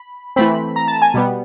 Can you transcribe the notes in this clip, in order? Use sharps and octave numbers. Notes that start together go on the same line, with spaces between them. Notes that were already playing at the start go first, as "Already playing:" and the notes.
Already playing: B5
E3 A3 C4 B5
A#5
A5
G#5
B2 G3 B3